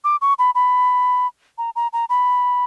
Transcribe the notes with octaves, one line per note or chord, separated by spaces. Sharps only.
D6
C#6
B5
B5
A#5
A#5
A#5
B5